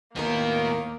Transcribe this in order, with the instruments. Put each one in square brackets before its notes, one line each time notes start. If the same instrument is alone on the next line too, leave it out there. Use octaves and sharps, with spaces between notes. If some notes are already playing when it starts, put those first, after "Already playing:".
[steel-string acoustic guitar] D#2 A2 A#4 [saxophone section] D#3 [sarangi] A#3 [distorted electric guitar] B3 F#4